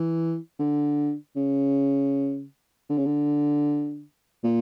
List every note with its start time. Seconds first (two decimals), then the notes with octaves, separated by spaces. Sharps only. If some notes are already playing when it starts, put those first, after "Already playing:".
Already playing: E3
0.59 D3
1.36 C#3
2.89 D3
2.97 C#3
3.06 D3
4.44 A#2